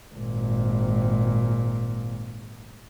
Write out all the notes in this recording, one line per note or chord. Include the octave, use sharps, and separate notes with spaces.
G#1 A#2